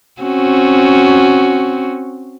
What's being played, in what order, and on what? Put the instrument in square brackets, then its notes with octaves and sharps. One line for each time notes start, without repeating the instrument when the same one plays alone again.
[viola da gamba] C4 C#4 F#4